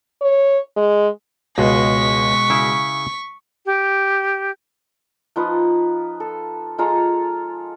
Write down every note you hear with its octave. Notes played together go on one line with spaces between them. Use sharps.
C#5
G#3
C#2 B2 G#3 C#6 B6
C#3 E4
G4
F3 D#4 F4 B4
A4
G#3 F4 A4 A#5